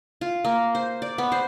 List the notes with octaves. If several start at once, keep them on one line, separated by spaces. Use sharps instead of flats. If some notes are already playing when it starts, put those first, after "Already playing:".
F4
A#3
C5
D5
B3
C5